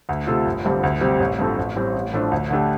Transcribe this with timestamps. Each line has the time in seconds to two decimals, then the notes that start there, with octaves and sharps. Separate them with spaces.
0.09 D2
0.27 C3 A3 F4 A4
0.47 G1
0.65 G2 D3 G3 C4
0.83 D2
1.01 C3 G3 C4 G4
1.20 A1
1.39 G2 F3 C4 A4
1.58 A1
1.76 A2 G3 C4
1.94 A1
2.13 A2 F3 A3 D4
2.31 D2
2.50 D3 A3 D4 G4